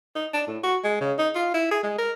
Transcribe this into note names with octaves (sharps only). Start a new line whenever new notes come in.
D#4
D4
A2
F#4
G#3
C#3
D#4
F4
E4
G#4
G#3
A#4